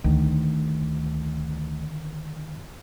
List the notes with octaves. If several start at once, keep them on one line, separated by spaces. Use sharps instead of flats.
D2 D3 D#3